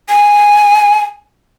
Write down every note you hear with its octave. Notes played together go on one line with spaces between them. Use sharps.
G#5